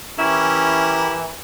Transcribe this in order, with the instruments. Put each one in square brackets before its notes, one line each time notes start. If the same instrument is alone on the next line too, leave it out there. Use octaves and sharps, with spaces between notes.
[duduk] E3 [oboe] C#4 [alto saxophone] E4 [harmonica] G4 A#4